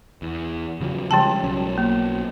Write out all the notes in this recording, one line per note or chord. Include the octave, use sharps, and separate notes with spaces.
E2
C#3 F3 F#3
C#3 F3 G3 G#3 G5 A5
B1 F#3 C#4
A#3